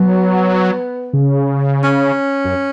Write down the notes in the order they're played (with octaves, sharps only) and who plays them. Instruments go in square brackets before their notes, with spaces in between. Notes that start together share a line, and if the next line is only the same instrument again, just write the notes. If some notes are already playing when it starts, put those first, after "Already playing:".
Already playing: [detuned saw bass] F#3 [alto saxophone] B3
[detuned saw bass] C#3
[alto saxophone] C#4
[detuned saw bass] F#2